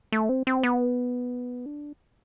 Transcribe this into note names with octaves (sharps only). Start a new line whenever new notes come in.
A3
C4
C4
B3
D4